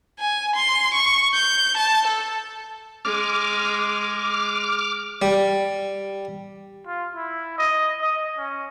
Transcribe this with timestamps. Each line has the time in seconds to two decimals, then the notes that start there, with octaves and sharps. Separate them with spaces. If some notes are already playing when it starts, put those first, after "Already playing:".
0.19 G#5
0.56 C6
0.94 C#6
1.34 G6
1.77 A5
2.07 A4
3.05 G#3 D6 F6
5.22 G3
6.87 F4
7.15 E4
7.58 D#5
8.02 D#5
8.38 C#4